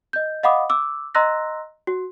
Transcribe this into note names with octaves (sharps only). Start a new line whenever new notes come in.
D#5 G6
D#5 F5 F#5 B5 D6 D#6
D6 E6
D#5 A#5 C6 E6 F#6 A#6
F#4